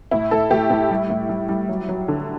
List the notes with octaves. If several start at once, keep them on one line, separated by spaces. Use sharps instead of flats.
A2 E4
A2 A4
A2 G4
A2 E4
G3
A2
G3
G3
F#3
F#3
D3